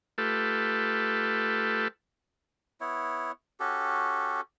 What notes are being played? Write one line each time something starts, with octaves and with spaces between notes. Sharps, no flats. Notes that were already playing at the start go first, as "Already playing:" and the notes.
A3 F4 G4 A4 B4
B3 E4 C#5
C#4 F#4 G4 A4